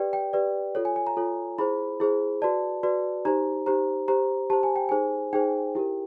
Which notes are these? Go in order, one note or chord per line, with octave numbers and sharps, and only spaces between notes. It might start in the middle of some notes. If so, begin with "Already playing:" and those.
Already playing: G4 B4 D5 G5
G5
G4 B4 D5
F4 A4 C#5
G#5
G#5
A#5
F4 A4 C#5
E4 G#4 C5 B5
E4 G#4 C5
F#4 B4 D5 A5
F#4 B4 D5
D#4 G4 C5 A#5
D#4 G4 C5 A#5
G4 C5 A#5
G4 C5 A5
G#5
G5
D#4 G#4 C5 G#5
D#4 G#4 C5 G5
E4 G4 A#4